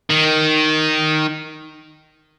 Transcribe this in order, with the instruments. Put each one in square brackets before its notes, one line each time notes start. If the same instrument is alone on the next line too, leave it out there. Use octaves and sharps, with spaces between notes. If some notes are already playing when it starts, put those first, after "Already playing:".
[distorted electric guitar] D#3